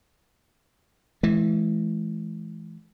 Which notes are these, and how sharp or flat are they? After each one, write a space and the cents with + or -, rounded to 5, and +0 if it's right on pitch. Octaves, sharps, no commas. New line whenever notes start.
E3 +0 G#3 +40